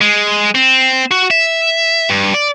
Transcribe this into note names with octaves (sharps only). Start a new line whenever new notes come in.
G#3
C4
F#4
E5
G2
D5